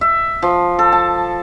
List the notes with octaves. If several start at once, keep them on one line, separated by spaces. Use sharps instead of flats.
E5
F3
A4
A5